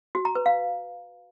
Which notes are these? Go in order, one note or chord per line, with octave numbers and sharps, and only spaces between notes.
F#4
A#5
B4
F5